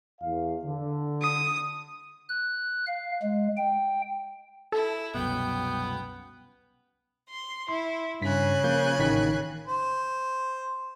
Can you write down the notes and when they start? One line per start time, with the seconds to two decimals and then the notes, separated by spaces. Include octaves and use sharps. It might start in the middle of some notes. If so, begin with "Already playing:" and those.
0.21 E2 F5
0.65 D3
1.22 D#6
2.29 F#6
2.87 F5
3.22 G#3
3.57 G5
4.72 E4 A4
5.15 C2 F#2 B2 B3 G5
7.29 C6
7.69 E4 C6
8.22 G2 C#3 G#5 F#6 B6
8.64 F3 A#3 G6
8.99 A1 D#3 B6
9.67 C5